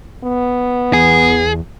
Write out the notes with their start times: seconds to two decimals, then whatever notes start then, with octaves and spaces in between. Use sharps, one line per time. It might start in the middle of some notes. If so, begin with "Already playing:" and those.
0.24 B3
0.93 E2 G#4